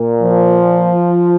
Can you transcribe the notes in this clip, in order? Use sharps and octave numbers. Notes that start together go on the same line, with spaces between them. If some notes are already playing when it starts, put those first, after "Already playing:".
Already playing: A#2
F3